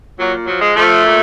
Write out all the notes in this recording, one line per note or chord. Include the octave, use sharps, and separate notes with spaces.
A#2 F#3
F3 F#3
G#3
F3 A3
A#2